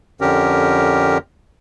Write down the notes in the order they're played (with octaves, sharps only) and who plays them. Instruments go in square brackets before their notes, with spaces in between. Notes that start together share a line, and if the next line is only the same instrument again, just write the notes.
[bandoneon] F2 D3 C#4 G4 A#4